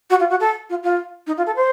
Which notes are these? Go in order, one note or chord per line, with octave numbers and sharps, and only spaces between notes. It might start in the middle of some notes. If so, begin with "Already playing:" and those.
F#4
F4
F#4
A4
F4
F4
D#4
F4
A4
C5